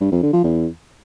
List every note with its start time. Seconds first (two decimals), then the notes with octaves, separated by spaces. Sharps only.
0.01 G2
0.12 F2
0.22 D3
0.33 F3
0.44 E2